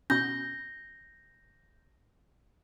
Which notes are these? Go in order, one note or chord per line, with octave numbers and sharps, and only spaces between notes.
B2 B3 C#4 G6 A#6